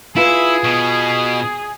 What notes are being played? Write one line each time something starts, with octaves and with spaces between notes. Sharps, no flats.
E4 F4 G#4 B4
B2